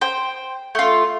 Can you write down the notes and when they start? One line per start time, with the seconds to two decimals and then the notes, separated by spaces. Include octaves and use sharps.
0.01 C5 G5
0.75 A3 F4